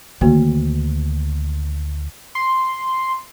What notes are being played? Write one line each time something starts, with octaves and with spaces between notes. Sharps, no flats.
D2 D#3 A#3 F#4
C6